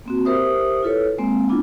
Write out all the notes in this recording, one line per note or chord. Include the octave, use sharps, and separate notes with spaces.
A#3 C4 F#4
G4 A#4 C5 E5 D#6
E4 F4 A4 B4 C#5
G#3 A#3 C4
B3 D4 E4 F4